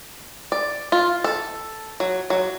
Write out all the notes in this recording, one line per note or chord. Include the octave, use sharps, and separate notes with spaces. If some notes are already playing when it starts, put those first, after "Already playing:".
D5
F4
A4
F#3
F#3